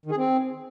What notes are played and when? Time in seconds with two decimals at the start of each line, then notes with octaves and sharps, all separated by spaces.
0.05 D#3
0.11 G#4
0.17 C4